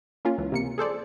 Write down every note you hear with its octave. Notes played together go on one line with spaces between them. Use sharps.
A#3 C#4 F4
C#2 E3
C3 A#3 C#7
G#4 A4 C5 D5